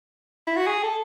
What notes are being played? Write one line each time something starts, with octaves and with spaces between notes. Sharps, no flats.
E4
F#4
G#4
A4